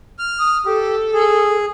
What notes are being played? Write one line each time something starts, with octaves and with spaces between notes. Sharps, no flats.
F6
D#6
G4 A4
G#4